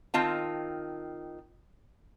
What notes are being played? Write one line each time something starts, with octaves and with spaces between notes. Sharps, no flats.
D#3 C4 F4 A5